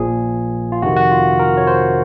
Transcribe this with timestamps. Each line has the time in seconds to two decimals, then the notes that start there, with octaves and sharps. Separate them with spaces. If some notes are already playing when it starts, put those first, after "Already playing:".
Already playing: A#1 A#2 F3 G#4
0.72 F4
0.82 F2 C3 D#3 F#4
0.97 F#4
1.11 F4
1.39 A#4
1.57 C#5
1.67 C5